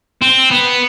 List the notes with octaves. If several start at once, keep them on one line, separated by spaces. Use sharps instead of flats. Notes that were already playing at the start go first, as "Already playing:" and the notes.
C4
B3